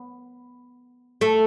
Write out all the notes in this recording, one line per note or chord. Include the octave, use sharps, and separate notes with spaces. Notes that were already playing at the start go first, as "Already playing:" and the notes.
Already playing: B3
A3